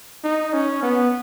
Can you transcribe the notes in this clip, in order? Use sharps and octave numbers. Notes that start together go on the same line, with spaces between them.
D#4
C#4
B3